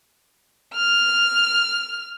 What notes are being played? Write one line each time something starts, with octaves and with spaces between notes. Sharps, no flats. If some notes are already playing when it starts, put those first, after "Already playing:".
F6